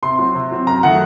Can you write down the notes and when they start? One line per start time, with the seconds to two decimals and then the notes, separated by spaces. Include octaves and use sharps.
0.02 C3 C6
0.19 F#3 C4
0.35 C3
0.51 F#3 C4
0.67 F#2 A#5
0.83 D#3 F#3 A3 F#5